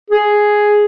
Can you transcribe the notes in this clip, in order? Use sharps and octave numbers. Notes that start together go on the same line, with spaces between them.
G#4